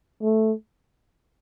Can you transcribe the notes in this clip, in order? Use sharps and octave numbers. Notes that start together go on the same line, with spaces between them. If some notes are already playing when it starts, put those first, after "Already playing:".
A3